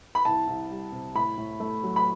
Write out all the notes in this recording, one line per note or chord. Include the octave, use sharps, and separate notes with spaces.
B5
C2 A5
C2
G3
C3
A2 B5
A2
A3
F#3
B5